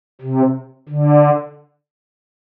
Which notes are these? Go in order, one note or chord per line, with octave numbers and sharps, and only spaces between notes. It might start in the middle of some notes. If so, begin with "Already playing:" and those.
C3
D3